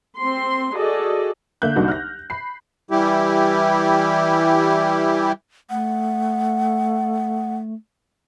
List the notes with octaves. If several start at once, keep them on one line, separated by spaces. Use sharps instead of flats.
C4 C6
F#4 G#4 A4 D5 D#5
D3 A#3 E5 F#6 G6
C2 A#3 D4 D#4 F#4
F6 F#6 A#6
B5 C7
E3 G3 E4 G4
A3 F#5